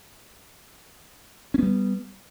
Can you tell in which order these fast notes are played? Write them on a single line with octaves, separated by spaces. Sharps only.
C#4 B3 G3